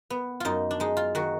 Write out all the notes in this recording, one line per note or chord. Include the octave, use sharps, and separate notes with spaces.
B3
F#2 D#4 F4
D4
G#3 D#4
F4
D#3 F#4